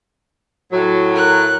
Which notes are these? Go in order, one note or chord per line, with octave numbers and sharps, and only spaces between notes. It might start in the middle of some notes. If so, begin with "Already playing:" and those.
A2 F#3
A#4 F#6